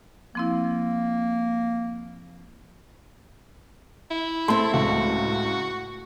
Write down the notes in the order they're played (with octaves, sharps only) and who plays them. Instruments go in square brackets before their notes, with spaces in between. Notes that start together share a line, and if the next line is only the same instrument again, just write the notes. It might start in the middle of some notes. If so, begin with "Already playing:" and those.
[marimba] F3 C4 E4 [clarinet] A#3
[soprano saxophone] E4
[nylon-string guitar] A3 C4 [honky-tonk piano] A5 C6
[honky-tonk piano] C#2 A2 [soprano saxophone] F#4